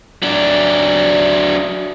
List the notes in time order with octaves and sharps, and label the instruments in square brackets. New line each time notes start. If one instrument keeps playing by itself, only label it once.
[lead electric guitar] F#3 D4